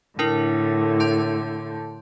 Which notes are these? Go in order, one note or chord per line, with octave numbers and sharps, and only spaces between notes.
A2 D3 D4 E4 A#4
A5 C6 G6